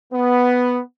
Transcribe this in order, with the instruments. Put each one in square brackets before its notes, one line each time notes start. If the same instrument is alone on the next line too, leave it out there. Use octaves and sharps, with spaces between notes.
[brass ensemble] B3